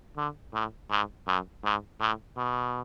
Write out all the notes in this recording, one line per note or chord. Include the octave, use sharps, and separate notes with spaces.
D3
A2
G#2
F#2
G#2
A2
B2